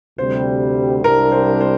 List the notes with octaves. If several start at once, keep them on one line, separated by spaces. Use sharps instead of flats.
D2 C3 G3 C5
C2 C3 G3 D4 A#4
C5
C5